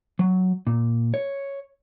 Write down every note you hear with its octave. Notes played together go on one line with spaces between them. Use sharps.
F#3
A#2
C#5